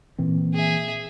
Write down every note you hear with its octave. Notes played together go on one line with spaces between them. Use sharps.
A#2 E3 C4
G#4 E5